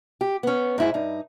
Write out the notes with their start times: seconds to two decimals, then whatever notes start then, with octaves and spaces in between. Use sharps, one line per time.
0.21 G4
0.43 B3 C#4
0.78 G#2 E4 G#4
0.94 G2 D#4